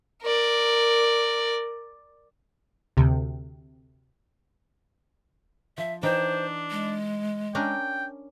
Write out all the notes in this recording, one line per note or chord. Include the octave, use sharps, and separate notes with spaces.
A#4 D5
D2 C3
F3 E5
E3 D4 D#4 C5 G5
G#3
C#4 D4 A#4 G5